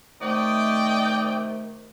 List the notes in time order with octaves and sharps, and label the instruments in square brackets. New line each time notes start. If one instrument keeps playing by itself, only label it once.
[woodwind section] C3 D#3 A3 [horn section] D5 D#5 G5